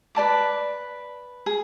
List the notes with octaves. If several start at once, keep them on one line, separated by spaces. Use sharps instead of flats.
B4 D5 A5 D6
G#4